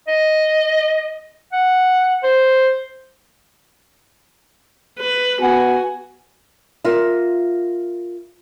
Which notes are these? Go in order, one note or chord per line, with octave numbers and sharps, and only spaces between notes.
D#5
F#5
C5
B4
B3 F#4 G#5
F4 A#4 E5